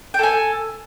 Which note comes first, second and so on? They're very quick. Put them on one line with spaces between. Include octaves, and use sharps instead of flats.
G5 A4 G#5